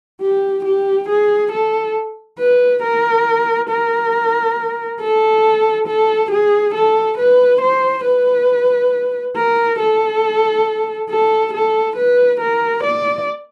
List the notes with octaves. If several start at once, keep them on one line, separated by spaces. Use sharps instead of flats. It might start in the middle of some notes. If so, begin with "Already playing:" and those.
G4
G4
G#4
A4
B4
A#4
A#4
A4
A4
G#4
A4
B4
C5
B4
A#4
A4
A4
A4
B4
A#4
D5